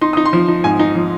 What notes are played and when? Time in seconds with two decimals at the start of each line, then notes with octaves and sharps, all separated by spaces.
0.01 D#4 C6
0.13 D#4 D#6
0.25 C6
0.33 F3
0.48 D#4
0.64 G#2 G#5
0.79 D#4
0.95 F3